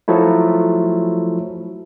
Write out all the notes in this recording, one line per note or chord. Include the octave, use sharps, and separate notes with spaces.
F3 F#3 A3 E4